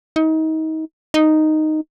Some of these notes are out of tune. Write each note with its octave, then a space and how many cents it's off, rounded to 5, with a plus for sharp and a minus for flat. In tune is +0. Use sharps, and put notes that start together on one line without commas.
D#4 +30
D#4 -5